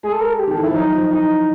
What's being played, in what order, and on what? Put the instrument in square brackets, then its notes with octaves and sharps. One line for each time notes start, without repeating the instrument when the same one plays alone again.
[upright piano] G#3 [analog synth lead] G#4
[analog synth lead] A4
A#4
A4
G4
[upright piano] D#3 [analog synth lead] A4
[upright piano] E3
[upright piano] F3 [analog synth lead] E4
[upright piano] F#3 [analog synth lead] D#4
[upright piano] F3
[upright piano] E3 [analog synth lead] D#4